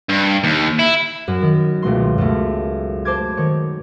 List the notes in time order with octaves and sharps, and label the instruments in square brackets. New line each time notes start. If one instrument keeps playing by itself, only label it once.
[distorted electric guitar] G2
D#2
E4
[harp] F#2
D#3
C#2 B2 A3 C6
F#2 A3
C5 A5 D6 G#6
D#3 C#5